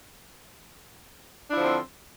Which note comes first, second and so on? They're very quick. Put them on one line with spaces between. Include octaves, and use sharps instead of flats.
D4 E4 F3 D3 C4